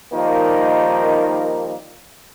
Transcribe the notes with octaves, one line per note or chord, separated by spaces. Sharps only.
D#3 F3 G3 A#3 D#4